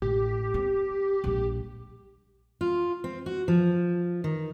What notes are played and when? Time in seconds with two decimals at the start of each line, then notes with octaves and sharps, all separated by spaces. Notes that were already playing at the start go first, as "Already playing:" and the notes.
0.02 A1 A2 G4
0.54 C4
1.24 A#1 G3
2.61 F4
3.04 C4
3.26 F#4
3.48 F3
4.24 D#3